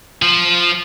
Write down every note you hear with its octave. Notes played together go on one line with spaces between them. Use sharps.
F3